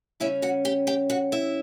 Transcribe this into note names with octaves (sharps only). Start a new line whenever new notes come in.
C#3 G3 C#4 E4 E5
F#4 F#5
G4 G5
G4 G5
F#4 F#5
E4 E5